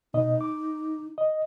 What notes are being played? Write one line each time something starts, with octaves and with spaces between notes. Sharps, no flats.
B2 D#4 D#5
D6
D#5